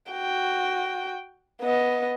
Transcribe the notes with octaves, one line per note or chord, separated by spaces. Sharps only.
F#4 G5
B3 D#5